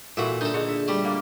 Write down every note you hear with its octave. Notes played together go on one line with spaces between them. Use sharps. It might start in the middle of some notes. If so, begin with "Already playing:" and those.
A#2 E3 F#4 A4 A#4 E5
D3 D#4 A4 G6
D3 G#4 D#5
E5
G3 A3
D3 A#3